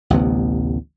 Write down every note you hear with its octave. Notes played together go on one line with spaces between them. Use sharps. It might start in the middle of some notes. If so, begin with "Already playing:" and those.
A1 D2 C3 B3